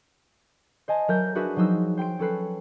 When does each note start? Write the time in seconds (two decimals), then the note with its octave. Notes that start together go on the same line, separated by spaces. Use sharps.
0.88 C5 D#5 G#5 A5
1.08 F#3 A#4 E5 G6
1.35 D4 F#4 G#4 A#4 B4 E5
1.56 F3 F#3 D#4 C5 E6
1.97 C5 G5 C6 D7
2.19 C#4 A4 B4 C7